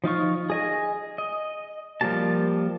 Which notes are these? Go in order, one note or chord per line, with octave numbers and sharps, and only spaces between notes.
F3 D#4 F4 C#6
G#4 D#5 G#5
D#5
F3 G3 A#3 G4 A5